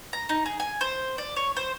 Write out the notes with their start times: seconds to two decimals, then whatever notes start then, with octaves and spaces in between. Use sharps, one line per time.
0.13 A#5
0.29 D#4
0.46 G#4
0.60 G#5
0.81 C5
1.18 D5
1.36 C#5
1.56 C5